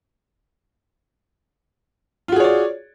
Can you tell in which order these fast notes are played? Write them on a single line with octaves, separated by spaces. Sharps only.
F4 F#4 G#4 C#5 D5